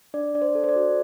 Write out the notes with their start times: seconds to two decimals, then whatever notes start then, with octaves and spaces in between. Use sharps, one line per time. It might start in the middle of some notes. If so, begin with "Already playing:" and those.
0.14 D4 D5
0.35 D4 D5
0.42 C5
0.55 A4
0.64 C5
0.69 D5
0.76 F#4